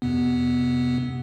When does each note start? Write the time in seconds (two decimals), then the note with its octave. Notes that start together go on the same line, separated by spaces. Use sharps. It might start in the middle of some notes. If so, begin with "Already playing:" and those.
0.02 F2 C3 B3